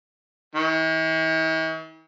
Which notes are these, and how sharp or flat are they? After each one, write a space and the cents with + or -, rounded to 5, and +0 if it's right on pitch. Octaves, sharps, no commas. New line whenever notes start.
E3 -45